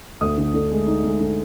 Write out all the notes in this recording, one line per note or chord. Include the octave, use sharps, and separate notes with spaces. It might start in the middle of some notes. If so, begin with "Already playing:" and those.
D2 D#6
D3
D3
G#3
D#4
G#3
D3